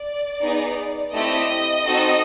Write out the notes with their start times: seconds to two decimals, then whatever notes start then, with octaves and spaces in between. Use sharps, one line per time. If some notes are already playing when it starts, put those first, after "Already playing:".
Already playing: D5
0.42 B3 D#4 G#4
1.14 A3 C4 E4 G4 D#5
1.86 C4 D#4 F#4 A4